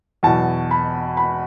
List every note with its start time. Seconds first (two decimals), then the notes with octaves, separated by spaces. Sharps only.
0.23 E2 B2 F#3 A5
0.71 B5
1.17 B5